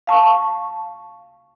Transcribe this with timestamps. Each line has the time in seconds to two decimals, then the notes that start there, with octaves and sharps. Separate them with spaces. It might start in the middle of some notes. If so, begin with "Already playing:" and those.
0.07 F5 A5 C#6